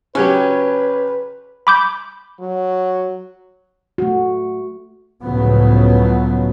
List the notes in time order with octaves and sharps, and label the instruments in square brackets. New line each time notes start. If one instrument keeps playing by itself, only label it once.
[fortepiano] C#3 F#3 G4 [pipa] C#4 [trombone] B4
[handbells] B5 D6 G6
[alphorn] F#3
[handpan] A3 F#4
[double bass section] C#2 A2 C#3 F3 F#3 B3